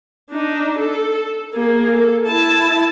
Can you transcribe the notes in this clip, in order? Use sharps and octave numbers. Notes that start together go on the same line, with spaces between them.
D4 D#4
A4
A#3 G#4
A4
E4 A5